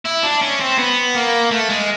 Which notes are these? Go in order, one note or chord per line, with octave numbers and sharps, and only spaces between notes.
E4
D4
C#4
C4
B3
A#3
A3
G#3